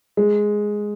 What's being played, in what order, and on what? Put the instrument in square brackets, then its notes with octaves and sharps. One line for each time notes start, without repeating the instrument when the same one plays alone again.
[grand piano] G#3